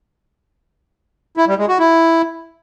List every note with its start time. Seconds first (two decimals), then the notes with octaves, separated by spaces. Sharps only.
1.37 E4
1.48 G3
1.58 G#3
1.69 F#4
1.79 E4